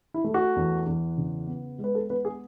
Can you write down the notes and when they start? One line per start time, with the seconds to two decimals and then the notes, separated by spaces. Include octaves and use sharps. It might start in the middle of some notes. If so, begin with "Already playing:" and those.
0.14 E4
0.24 A3
0.34 F#4
0.56 E2
0.86 E2
1.18 C#3
1.47 B3
1.78 G#3
1.84 B4
1.95 A4
2.10 B3 B4
2.25 G#4